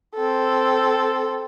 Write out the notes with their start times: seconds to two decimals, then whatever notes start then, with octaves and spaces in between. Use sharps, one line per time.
0.15 C4 A4